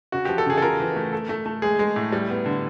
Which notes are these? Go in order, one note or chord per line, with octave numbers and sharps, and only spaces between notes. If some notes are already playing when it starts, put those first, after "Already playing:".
C#3 F#4
F3 G4
A4
C#3 G#4
A4
F4 A#4
E3
A3
A4
A3
A3
G#3 G#4
G#3
A2
G3
B3
D3